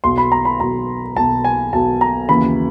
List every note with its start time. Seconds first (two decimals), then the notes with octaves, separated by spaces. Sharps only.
0.04 B1 B2 C6
0.18 B5
0.32 A#5
0.45 B5
0.60 B1 B2 A#5
1.16 B1 B2 A5
1.44 G#5
1.73 B1 B2 A5
2.01 A#5
2.29 D#2 C#3 E3 B5